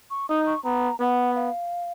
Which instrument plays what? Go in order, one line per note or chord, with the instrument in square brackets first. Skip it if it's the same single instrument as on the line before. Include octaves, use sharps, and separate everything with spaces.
[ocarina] C#6
[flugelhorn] D#4 [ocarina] D#6
[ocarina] C#6
[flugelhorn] B3 [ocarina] A#5
[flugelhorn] B3 [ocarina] F#5
[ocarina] F5